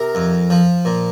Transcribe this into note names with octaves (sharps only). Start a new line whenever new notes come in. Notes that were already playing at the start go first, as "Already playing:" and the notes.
Already playing: C3 A#4
F2
F3
A#2